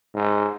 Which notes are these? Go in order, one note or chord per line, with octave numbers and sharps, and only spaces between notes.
G#2